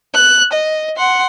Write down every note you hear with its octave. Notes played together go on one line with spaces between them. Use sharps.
F#6
D#5
F#5 C6